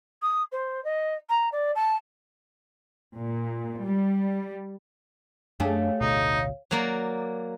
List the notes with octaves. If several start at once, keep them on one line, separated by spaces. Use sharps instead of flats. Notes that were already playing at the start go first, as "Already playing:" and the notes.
D#6
C5
D#5
A#5
D5
A5
A#2
G3
F#2 A3 D4 G4 G#4 C#5 F5
A1 D2 B2 D#4
F#3 A#3 D5